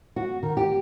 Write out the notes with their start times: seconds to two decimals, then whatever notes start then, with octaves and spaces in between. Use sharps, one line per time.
0.16 F#4
0.43 D#3
0.57 G4